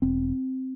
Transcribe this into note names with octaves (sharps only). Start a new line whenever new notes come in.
E1 C4